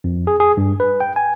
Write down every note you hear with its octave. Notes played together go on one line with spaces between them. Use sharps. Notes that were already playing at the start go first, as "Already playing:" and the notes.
F2
G#4
G#4
G2
B4
G5
G#5